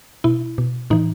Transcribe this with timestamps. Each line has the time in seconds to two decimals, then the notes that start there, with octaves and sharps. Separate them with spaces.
0.24 B2 E4
0.58 B2
0.90 A2 E3 D#4